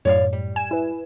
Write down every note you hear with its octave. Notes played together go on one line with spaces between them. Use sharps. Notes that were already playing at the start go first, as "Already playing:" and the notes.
F#2 A2 C#5 D5 F5
G3
G#5 E7
E4 B4